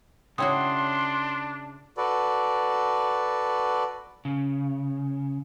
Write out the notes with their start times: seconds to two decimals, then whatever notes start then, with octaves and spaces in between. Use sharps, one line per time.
0.38 C#3 D4 E4 F#4 C#5 G5 C6 D#6
1.97 F#4 A4 B4 D5
4.25 C#3